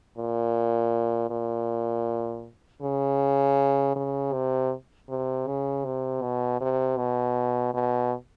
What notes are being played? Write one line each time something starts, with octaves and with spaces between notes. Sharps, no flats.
A#2
A#2
C#3
C#3
C3
C3
C#3
C3
B2
C3
B2
B2